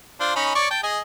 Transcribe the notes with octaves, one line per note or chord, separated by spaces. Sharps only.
D4 F4 C5
C#4 D#4 B5
C#5 D5 C#6
G5 A5
G#4 D#5 G#5